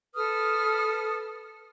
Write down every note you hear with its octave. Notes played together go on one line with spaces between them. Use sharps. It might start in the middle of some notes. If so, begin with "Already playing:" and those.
A4 B4 D#6 F6